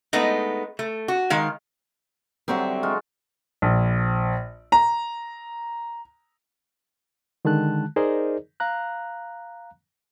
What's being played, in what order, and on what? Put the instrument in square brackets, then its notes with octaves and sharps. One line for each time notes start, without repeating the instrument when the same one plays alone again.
[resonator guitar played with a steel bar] G#3 A3 B3 D#4
A3
F#4
D#3 G#3 F5
[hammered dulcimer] D3 F#3 [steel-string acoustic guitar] G3 C4 E5
[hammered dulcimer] G#3 F4 F#4
[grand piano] A#1
A#5
[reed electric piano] D3 D#3 G#3 A5 F#6
D#4 G#4 A#4 C5 D5 D#5
F5 A#5 F#6